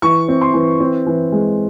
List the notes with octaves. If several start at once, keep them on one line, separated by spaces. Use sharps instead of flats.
E3 C#6
C4
C6
E3
C4
E3
G#3